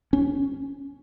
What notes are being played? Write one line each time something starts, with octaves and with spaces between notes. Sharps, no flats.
C#4